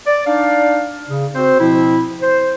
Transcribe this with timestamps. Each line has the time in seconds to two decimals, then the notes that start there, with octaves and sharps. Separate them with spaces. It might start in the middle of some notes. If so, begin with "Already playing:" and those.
0.07 D5
0.27 D4 D#4 D5 F5
1.09 C#3
1.35 C4 F#4 C5
1.60 B2 F3 C4 E4
2.22 C5